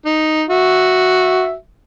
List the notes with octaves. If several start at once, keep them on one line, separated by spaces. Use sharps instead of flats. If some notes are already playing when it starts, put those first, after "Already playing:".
D#4
F#4 E5